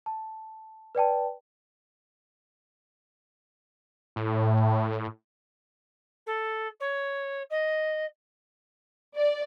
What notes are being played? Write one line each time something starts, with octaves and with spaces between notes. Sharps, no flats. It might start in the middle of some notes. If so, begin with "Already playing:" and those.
A5
B4 D5 G5 A5
A2
A4
C#5
D#5
D5